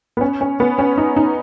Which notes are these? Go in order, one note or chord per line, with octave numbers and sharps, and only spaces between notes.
B3
C#4
C#4
B3
C#4
D#4
D#4